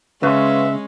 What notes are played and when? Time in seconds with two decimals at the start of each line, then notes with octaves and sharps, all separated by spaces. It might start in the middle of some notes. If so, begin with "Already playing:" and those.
0.23 C#3 G#3 C#4 B4 E5 F5 C6